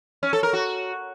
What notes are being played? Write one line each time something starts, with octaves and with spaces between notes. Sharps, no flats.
C#4
A4
A#4
F#4